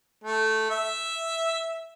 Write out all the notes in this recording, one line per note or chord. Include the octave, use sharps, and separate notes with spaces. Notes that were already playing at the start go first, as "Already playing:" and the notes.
A3
E5